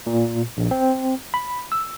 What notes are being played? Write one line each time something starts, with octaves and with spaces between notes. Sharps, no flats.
A#2
A#1
C4
B5
E6